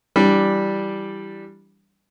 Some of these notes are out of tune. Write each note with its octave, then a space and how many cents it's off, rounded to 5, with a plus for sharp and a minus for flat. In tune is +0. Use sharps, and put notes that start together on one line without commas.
E3 +15 G3 +0 D4 +0